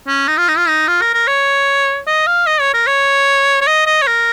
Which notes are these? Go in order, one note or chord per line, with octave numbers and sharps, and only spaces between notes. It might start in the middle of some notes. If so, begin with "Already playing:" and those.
C#4
D#4
F4
D#4
F4
D#4
F4
A#4
A#4
C#5
D#5
F5
D#5
C#5
A#4
C#5
C#5
D#5
D#5
C#5
A#4